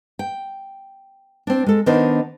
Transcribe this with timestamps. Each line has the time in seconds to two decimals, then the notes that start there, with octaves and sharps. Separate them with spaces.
0.19 G5
1.47 C4 D4
1.66 G#3 A4
1.86 D#3 B3 D4 D#4 C5 D#5